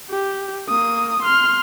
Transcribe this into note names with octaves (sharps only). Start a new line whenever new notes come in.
G4
A#3 D#6
C6 F6